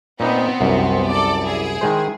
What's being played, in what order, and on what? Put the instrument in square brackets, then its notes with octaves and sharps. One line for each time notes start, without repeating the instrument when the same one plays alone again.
[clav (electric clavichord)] A#2 D#4 B4 [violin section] B3 C4
[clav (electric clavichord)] C2 F#2
[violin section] A4 D5
E4 G#4
[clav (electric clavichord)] D#3 G#3 C5